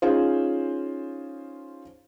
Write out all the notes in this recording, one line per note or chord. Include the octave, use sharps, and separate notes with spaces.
C#4 D#4 F4 G#4 C5